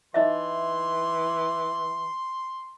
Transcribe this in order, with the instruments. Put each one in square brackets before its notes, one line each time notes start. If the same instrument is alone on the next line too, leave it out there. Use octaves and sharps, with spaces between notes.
[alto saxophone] E3 [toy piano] D#4 D#5 E5 [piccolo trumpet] C6